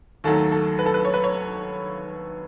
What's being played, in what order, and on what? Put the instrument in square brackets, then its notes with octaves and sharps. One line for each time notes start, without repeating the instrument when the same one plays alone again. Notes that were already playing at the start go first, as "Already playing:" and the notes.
[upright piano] D#2 D#3 F#3 A3 A4
A4
B4
A4
B4
C#5
B4
C#5